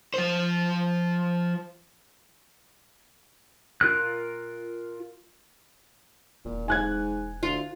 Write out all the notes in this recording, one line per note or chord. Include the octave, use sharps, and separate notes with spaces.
F3 C5
F4 A#4 F#6
E1 A#2
G#2 G#5 F#6 G#6
D2 F4